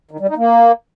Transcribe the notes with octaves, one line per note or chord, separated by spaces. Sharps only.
D#3
G3
D#4
A#3